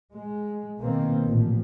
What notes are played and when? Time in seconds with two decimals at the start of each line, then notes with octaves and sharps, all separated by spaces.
0.13 G#3
0.80 B2 D#3 A#3 C4
1.25 A1 A#2 F3